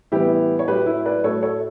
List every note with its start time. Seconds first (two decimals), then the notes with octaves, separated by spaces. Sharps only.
0.12 A2 E3 G3 B3 E4 G4
0.59 C#5
0.68 A2 F#3 A3 G4 B4
0.86 E4
1.05 B4 D5
1.24 A2 F#3 A3 A4 C#5
1.43 A4 C#5